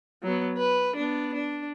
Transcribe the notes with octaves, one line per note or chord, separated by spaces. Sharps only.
F#3 B3
B4
B3 D4
D4